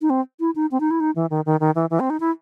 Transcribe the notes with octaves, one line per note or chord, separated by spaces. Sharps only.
D#4
C4
E4
D#4
C4
D#4
E4
D#4
E3
D#3
D#3
D#3
E3
E3
C4
D#4
E4